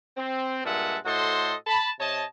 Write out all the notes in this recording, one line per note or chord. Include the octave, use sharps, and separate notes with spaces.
C4
G2 A#2 G#3 E5 F#5 A5
A2 F#4 A4 C5 D#5 C6
A5 B5
C3 C#5 D#5 A5